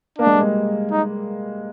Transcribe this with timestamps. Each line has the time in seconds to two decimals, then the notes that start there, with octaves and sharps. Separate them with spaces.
0.19 A#3 D4
0.26 G#3
0.34 G3
0.41 G#3
0.91 D#4